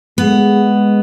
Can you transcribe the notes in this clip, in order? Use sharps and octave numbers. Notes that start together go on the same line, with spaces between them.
G#3 B3